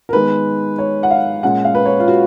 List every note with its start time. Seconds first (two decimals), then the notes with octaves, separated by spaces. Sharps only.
0.09 A#4
0.13 D#3 G#3 B3 B4
0.78 C#5
1.03 F#5
1.11 F5
1.43 A#2 G#3 C#4 F#5
1.65 F5
1.75 B4
1.86 C#5
1.99 F4
2.08 F#4